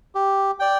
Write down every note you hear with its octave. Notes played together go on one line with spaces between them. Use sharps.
G4
D5 G5